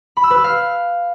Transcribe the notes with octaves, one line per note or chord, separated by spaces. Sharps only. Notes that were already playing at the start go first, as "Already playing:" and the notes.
B5
E6
B4
E6
F5